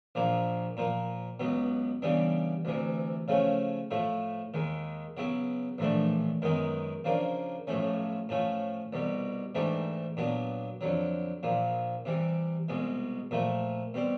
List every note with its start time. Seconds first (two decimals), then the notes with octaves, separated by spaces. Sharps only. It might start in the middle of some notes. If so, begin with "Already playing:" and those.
0.15 A#1 A#2 F3 A#3
0.77 A#2 F3 A#3
1.40 C#2 B2 F#3 B3
2.02 C#3 E3 G3 B3 D4
2.65 D2 C3 E3
3.28 C#3 F3 A3 C#4
3.91 A2 F3 A3
4.54 D#2 D#3 G#3
5.17 C#3 F#3 B3 E4
5.78 A#1 A2 E3 A3 D4
6.42 F#2 D#3 G#3 B3 D#4
7.04 C#3 F3 A#3 D4
7.67 B1 A2 F3 A3 C#4
8.29 A2 F3 A3 C#4
8.93 C2 B2 G3
9.55 G#2 E3 A3 D4 G4
10.17 A#2 F#3 B3 D4
10.81 F2 D3 F#3
11.43 A#1 A#2 F3
12.05 C3 E3 G3
12.69 C2 B2 G#3
13.31 A#2 F3 A3
13.94 B2 G3 C4